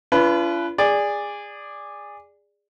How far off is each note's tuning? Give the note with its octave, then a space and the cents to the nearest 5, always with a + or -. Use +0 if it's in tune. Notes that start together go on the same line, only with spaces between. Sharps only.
D4 -45 F4 -40 B4 +0
G#4 -20 D5 +0